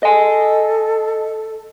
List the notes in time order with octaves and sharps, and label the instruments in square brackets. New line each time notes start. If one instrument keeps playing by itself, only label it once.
[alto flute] A4 [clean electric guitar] D#5 G#5